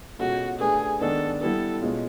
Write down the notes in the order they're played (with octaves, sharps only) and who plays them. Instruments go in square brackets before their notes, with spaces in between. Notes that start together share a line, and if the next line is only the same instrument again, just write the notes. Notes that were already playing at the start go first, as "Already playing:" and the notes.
[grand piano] B2 G#3 C#4 F4 A4 [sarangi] F#4
[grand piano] A3 D4 G4 B4 [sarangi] G#4
[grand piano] D#3 G#3 B3 D4 [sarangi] A4
[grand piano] G3 B3 E4 G4 B4 [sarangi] A4
[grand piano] B2 G#3 C#4 F4